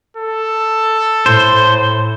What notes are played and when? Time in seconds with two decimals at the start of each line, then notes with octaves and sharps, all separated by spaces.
0.17 A4
1.26 A2 C5